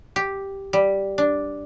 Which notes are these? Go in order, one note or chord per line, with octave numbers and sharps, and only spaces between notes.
G4
G3
D4